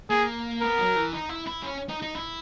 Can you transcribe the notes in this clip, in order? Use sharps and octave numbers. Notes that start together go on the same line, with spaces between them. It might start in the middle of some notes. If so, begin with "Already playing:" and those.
A#3 G#4
B3 A#4
F#3
E3
D#4
E4
E4
C#4
D#4
D#4
E4